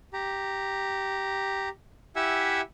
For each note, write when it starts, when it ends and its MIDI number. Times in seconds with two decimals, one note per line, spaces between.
0.13 1.69 67
0.13 1.69 82
2.16 2.61 64
2.16 2.61 67
2.16 2.61 76
2.16 2.61 78
2.16 2.61 80
2.16 2.61 88